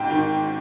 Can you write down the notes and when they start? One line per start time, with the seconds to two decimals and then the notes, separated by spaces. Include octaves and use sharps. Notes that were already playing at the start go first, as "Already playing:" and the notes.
Already playing: G#2 G5
0.10 D#3